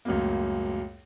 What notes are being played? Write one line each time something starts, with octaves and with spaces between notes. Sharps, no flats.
C#2 F#2 A2 F#3 A#3